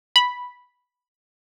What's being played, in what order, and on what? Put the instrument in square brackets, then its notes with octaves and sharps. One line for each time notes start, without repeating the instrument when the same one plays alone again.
[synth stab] B5